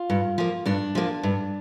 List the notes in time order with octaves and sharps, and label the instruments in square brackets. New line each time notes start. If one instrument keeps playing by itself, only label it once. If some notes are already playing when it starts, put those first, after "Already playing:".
Already playing: [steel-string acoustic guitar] F4
G2
F3 A#3
G2 D4
F3 A#3
G2